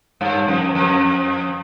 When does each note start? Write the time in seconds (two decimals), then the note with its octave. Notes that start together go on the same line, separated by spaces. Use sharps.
0.21 G2
0.48 F2
0.75 F2